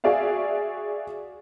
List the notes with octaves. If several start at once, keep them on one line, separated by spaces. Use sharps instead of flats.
F#4 G#4 D5 E5 F5